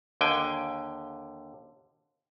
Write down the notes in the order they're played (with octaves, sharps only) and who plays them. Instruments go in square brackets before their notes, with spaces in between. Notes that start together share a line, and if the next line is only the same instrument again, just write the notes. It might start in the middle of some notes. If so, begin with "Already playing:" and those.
[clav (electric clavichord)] D#2 D3 G5 G#5